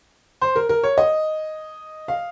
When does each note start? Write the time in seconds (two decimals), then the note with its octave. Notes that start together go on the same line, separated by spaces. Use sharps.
0.42 C5
0.56 A#4
0.69 A#4
0.83 C#5
0.98 D#5
2.08 F5